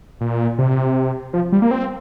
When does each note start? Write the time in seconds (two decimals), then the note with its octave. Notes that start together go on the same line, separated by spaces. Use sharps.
0.21 A#2
0.58 C3
1.33 F3
1.52 G3
1.62 A#3
1.71 C4